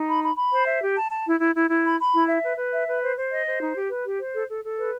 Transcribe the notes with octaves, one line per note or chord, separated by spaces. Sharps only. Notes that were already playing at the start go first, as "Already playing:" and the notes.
Already playing: D#4
B5
B5
B5
C5
E5
G4
A5
A5
E4
E4
E4
E4
B5
B5
E4
E5
B4
B4
E5
B4
C5
C5
D#5
C5
D#4
G4
B4
G4
C5
A4
A4
A4
B4